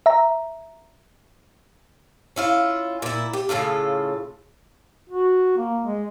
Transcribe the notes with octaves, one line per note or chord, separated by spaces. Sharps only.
E5 A#5
C#4 E4 F4
A#2 E4
G4
A2 C#3 F4 A4
F#4
A#3
G#3